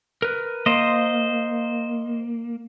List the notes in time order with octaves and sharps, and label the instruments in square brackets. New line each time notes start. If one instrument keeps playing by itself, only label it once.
[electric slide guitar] A#4 B4
[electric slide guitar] A#3 [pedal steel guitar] C5 D#5